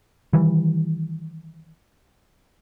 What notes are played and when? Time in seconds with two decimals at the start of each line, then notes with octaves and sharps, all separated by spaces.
0.33 D#3 E3 G3